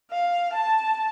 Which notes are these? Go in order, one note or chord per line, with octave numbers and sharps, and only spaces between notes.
F5
A5